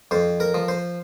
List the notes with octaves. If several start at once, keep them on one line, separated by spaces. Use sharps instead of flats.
F2 C5
A#4
F3
C5